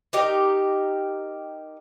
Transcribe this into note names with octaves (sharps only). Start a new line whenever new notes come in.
D#4 G4 A#4